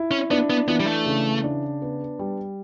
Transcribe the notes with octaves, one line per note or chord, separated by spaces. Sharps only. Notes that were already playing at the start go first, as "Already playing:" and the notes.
Already playing: E4
C#4
B3 D4
B3
E3 B3
G3
A3
C#3
D4
B3
G3